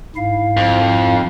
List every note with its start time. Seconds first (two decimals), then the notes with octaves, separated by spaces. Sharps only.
0.16 G#2 E4 F5
0.57 F2